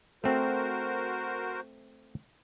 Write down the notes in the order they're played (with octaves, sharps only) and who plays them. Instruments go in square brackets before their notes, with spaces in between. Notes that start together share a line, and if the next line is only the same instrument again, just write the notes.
[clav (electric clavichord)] A3 C4 [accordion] F#4 A#4 C5